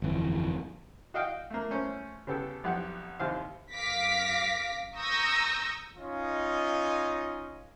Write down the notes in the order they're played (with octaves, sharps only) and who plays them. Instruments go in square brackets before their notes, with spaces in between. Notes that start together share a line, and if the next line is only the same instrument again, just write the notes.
[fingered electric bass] G1 F2 E3
[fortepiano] F#4 D#5 F5 G5
A3 A#3
A3 C#4 C5
C#3 B3 G4 A4
B1 F2 G4 F#5
D#2 C3 C5 F5
[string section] F#2 F5 D6 A#6 B6
A#5 C#6 D#6 E6 G6 A#6
[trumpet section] C#4 D#4 F4 D#5